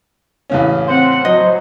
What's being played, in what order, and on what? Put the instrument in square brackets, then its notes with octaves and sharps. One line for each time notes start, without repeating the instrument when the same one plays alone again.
[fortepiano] A1 C#3 C#4
[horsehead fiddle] C4 F#5 [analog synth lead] C5
[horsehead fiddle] F#3 [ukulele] D#5